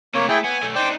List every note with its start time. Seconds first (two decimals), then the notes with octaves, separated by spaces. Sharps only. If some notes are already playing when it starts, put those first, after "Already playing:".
0.15 C3 A3 A#3 C#5
0.29 A3 E4 G#4 G5
0.44 B3 G#5
0.63 B1 A3
0.75 D4 D#4 C5 G5 D6